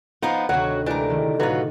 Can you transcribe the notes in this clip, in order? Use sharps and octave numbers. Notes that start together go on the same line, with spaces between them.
F3 B3 D#4 F4
D2 C3 D#3 F#3 F#4 C#5 F#5
E3 G#3 A3 D4 G4 A#4
D#3 A3
A2 F#3 F4 F#4 B4